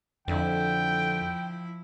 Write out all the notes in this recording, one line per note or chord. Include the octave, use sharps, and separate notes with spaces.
F2 D3 F3 E4 G5